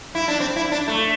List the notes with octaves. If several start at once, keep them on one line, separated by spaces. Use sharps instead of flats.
E4
D4
C4
E4
D4
A3